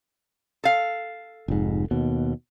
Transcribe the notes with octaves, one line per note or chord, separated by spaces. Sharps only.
A4 F5
F1 G#2
D#2 B2